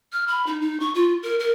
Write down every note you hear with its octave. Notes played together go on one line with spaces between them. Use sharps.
F6
B5
D#4
D#4
C#6
F4
A#4
A#4